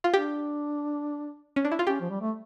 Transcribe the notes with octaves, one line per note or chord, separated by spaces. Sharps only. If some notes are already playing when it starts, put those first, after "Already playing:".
F4
D4 G4
C#4
D4
E4
F4
C#4 G4
F3
G3
A3